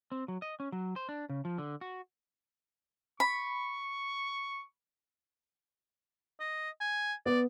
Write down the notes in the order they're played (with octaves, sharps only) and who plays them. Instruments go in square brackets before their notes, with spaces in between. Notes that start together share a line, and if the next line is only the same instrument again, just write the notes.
[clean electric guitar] C4
F#3
D#5
C#4
F#3
C5
D4
C#3
F3
D3
F#4
[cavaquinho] B5 [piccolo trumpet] C#6
[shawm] D#5
G#5
[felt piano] B3 [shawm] D5